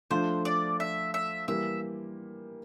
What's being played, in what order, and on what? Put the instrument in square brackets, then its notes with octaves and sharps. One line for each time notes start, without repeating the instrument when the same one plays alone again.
[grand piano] F3 A3 D4 F4 A4 [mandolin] C5
[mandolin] D5
E5
E5
[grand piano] E3 G3 A#3 [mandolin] E5